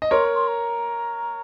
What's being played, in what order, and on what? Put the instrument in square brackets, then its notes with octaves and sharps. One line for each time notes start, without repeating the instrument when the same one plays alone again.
[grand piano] D#5
[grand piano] A#4 C#5 [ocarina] C6
[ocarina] C6
A#5